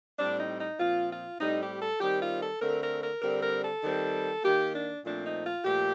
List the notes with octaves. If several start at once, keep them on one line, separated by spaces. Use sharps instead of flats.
A2 G3 C4 D4
D#4
D#4
A#2 F3 C4 F4
F4
A2 G3 C4 D#4
G4
A4
D#3 G3 C4 G4
F4
A4
D3 A3 C4 A#4
A#4
A#4
D3 G3 C4 A#4
A#4
A4
D#3 G3 C4
D#3 A#3 G4
D4
A#2 F3 A3 C4 D4
D#4
F4
A#2 F3 A3 G4